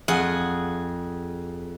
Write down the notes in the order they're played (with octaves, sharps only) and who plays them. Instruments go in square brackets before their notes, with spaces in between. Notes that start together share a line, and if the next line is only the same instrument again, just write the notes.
[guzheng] F2 G#4 F#5